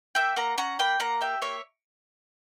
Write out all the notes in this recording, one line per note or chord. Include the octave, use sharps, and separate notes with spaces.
A#3 E5 G5
A#3 F#5 A#5
C#4 F#5 A#5
A#3 G5 B5
A#3 F#5 A#5
G4 E5 G5
A#3 C#5 E5